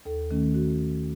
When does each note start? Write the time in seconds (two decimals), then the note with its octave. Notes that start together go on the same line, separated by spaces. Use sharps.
0.06 D#2 A4
0.31 D#3 A3 C#4
0.54 F#4